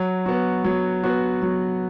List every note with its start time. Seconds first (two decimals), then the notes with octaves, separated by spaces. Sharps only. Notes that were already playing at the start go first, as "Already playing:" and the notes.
Already playing: F#3
0.26 B3 F#4
0.64 F#3
1.04 B3 F#4
1.42 F#3